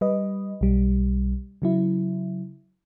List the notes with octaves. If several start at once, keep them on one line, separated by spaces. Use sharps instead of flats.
G3 B4 D#5
B1 G3
C#3 F#3 E4